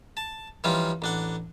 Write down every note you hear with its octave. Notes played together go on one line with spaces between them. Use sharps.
A5
E3 F3 G3 C#4 D#4 F4
A1 D4 F#5